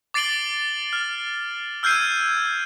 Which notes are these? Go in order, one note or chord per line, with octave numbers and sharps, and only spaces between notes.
D6 A6 C7 D7 F#7 G7
F6
E6 F6 G6 G#6 C7 D#7